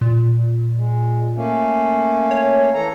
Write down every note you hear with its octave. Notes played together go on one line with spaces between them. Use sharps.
A#2
G#3
A3 A#3 C#4
C#5
E3 A4 A#5